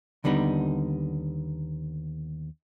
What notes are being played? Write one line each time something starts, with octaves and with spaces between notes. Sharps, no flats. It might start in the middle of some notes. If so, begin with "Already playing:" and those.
D#2 D3 G3 B3 D#4